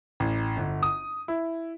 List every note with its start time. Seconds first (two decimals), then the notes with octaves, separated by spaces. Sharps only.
0.20 A1
0.57 G1
0.83 D#6
1.28 E4